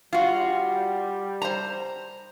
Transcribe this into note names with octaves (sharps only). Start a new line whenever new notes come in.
G3 F4 F#4
C5 A#5